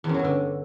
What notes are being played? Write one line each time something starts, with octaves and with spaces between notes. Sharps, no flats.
E2
F#2
F#3
G2
D3